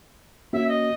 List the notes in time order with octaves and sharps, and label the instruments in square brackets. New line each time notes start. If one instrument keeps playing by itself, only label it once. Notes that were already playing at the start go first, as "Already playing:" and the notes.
[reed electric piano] A#3 C#4 F#4 [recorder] E5
[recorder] D#5